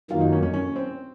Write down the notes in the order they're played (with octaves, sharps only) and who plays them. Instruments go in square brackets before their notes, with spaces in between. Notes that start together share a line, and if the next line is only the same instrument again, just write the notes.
[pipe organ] F#2 D#3 F#3 A#3 [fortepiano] F4
[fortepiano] D#4
C#4
C#4
C#4
C4